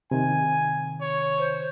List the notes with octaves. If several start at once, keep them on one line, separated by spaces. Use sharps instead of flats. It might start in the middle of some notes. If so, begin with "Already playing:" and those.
C3 D#3 G#5
C#5
C5